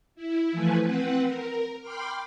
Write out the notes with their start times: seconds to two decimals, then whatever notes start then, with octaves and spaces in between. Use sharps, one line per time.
0.15 E4
0.52 E3 F3 A3 B4 G#5
0.84 C4 B4 F#5
1.27 A#4
1.81 G5 B5 C6 D6 F6